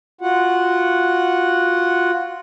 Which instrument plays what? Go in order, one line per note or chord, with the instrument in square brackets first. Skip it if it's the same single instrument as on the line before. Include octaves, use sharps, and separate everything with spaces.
[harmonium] F4 F#4 F#5